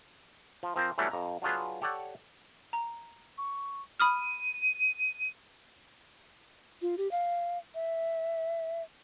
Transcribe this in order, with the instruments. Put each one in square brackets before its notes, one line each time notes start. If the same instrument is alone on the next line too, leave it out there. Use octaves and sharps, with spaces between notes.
[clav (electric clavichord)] F3
F3 C4 A#4 C5
E3 F#3 G3 A3 C#4 D4
F2 A#5
F#3 D4 F4 G#4 B4
G4 A4 C#5 D5 F#5
[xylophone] A#5
[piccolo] C#6
[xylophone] B5 D#6 F6 [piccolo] D#7
[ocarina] F4
G4
F5
E5